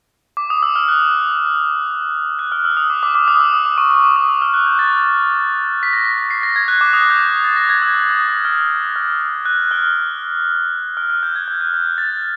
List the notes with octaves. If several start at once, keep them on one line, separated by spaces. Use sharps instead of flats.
D6
D#6
E6
F6
F#6
F#6
F6
E6
D#6
D6
D6
D6
D#6
E6
D#6
D6
C#6
D6
D#6
E6
F6
F#6
G6
A6
B6
A#6
B6
B6
C7
A#6
G#6
F#6
D6
D#6
G6
A6
A#6
G#6
E6
E6
D#6
F6
F6
F6
F#6
F6
F6
F#6
G6
G#6
G6
F#6
G6
G6
A6